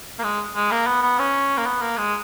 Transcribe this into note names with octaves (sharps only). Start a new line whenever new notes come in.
A#3
G#3
G#3
A#3
B3
B3
C#4
A#3
B3
A#3
G#3